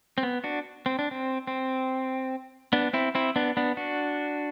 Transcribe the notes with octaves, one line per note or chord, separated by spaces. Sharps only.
C4
B3
D4 F#4
C4
D4
C4
C4
B3 D4
C4 E4
C4 E4
B3 D4
B3 D4
D4 F#4